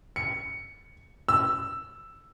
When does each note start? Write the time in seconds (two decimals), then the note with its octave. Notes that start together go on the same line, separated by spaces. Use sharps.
0.16 C#7
1.28 E6